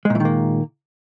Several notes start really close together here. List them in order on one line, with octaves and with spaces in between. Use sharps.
G#3 A#2 E3 D#3 A#3